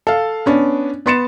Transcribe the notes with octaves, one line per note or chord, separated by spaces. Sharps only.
A4 F5
B3 C#4 D4
B3 B4 C6 A6 C#7 E7